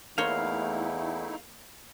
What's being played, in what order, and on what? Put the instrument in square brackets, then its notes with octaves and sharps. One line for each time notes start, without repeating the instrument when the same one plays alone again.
[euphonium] E2 [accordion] A3 D#4 E4 [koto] A#3 C5 C#5 [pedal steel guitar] F5